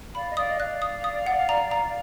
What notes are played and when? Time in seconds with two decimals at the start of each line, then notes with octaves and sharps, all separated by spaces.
0.15 D5 F5 B5
0.30 D#5
0.37 D5 F5 D#6
0.49 D#5
0.60 D5 F5 F#6
0.82 D#6
1.04 D#6
1.26 F#5
1.49 A#5
1.71 A#5